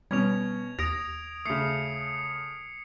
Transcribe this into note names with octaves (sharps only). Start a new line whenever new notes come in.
B2 G3 C#4 G#6 F7
D#2 D#6 A#6 D7 F7
C#3 A3 D#6 C7 C#7